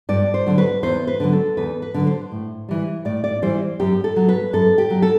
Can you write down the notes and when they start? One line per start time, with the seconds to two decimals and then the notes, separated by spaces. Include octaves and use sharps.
0.09 G2 D5
0.34 C5
0.46 D3 F#3
0.58 B4
0.83 E2 C5
1.07 B4
1.20 D3 F#3
1.33 A4
1.57 E2 B4
1.82 B4
1.94 D3 F#3
2.07 C5
2.32 A2
2.69 E3 G3
3.05 A2 D5
3.24 D5
3.42 E3 G3 C5
3.80 F#2 G4
4.04 A4
4.16 F#3
4.29 B4
4.53 F#2 A4
4.78 G4
4.90 F#3
5.02 A4